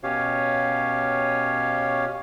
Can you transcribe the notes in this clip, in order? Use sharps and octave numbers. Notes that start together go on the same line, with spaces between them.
B2 C#4 G4 C#5 F5